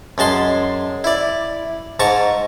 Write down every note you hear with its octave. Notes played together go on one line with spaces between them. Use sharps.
F#2 G#3 A5 C6
E4 D5
G#2 A5 A#5 C#6